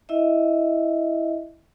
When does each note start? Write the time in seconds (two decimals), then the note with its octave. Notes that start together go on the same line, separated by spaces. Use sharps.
0.09 E4 D#5 E5